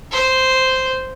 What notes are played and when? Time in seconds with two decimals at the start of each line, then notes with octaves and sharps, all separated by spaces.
0.12 C5